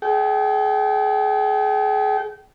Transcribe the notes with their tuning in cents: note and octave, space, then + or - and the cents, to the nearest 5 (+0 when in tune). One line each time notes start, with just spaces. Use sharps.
G#4 +30 G5 -30